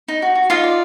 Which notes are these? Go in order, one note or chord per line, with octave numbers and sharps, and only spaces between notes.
D#4
F#4
F#4
D#4 F4 F5
D5